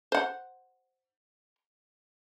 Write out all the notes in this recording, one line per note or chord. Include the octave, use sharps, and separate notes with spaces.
C5 F#5